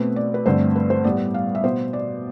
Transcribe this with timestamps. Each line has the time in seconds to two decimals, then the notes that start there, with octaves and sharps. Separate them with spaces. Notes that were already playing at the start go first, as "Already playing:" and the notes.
Already playing: B2 A3 C4 B4
0.16 D5
0.34 B4
0.46 G2 D3 A3 C4 C5
0.76 B4
0.90 C5
1.04 A2 G3 B3 D5
1.34 F5
1.55 E5
1.64 B2 B3 C5
1.93 D5